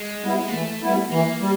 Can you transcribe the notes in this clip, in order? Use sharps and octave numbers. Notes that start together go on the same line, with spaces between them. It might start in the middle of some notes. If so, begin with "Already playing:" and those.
Already playing: G#3
G3 B3 E4
A#3
E3 A3
G3 B3 E4
E3 A#3
G3